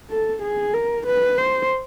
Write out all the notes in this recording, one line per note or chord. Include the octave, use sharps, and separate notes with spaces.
A4
G#4
A#4
B4
C5